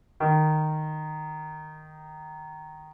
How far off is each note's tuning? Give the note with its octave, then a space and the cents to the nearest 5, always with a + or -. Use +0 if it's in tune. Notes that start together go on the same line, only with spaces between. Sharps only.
D#3 -10